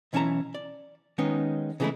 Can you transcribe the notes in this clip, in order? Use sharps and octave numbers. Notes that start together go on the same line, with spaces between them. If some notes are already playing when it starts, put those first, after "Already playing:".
B1 E3 C#4 E4 A5 A#5
D5
D#3 G#3 B3 C#4 D#4
C#3 E3 G#3 A3 D#4 E4